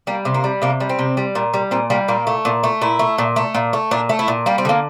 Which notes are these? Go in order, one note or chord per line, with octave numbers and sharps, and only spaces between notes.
G3 A#3
C3
A#3
G3
C3 A#3
G3
C4
C3
G3
A#2
G3
A#2 C4
G3 A#3
A#2 A#3
A3
A#2
A3
A#2 E4
A3
A#2
A3
A#2
A3
A#2 D4
A3
E4
A#2
G3 A#3
C4
D3 A#3